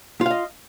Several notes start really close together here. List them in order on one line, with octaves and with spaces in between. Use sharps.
F4 F5 D#5